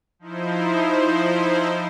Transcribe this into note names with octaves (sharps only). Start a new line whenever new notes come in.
F3 D#4 E4 C5